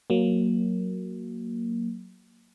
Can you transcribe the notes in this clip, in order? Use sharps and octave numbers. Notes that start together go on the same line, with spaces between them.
F#3 A#3